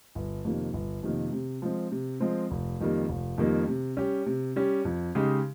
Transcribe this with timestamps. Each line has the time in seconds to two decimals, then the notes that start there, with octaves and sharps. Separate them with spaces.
0.15 G1
0.44 F2 C3 D#3 A#3
0.74 G1
1.03 F2 C3 D#3 A#3
1.33 C3
1.62 F3 G#3 C4
1.92 C3
2.20 F3 G#3 C4
2.51 F1
2.80 F2 D#3 G3 A#3
3.09 F1
3.38 F2 D#3 G3 A#3
3.68 C3
3.97 G3 C#4 G4
4.26 C3
4.56 G3 C#4 G4
4.85 F2
5.15 C#3 G#3 D#4 G4